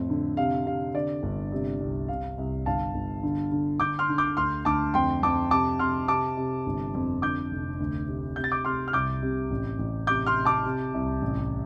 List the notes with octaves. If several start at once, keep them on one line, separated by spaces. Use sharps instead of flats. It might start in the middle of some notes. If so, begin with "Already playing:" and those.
Already playing: F2 A2
D3
C3 F5
C3 F5
D3 D5
G1
C3
C2
C3 F5
C2
G1 F5 A5
G1
D3
D3
D3 D6 G6
C6 F6
D3
D6 G6
D2 C6 F6
D2 A5 D6
F2 G5 C6
F2 A5 D6
C3 A5 D6
C3 C6 F6
C3 A5 D6
C3
G1
F2
D3 D6 G6
F1
D2
C3
C3 G6
A6
D6 G6
C3 C6 F6
F6
C2 D6 G6
C3
A1
A1
C3 D6 G6
C6 F6
C3
A5 D6
C3
C2
A1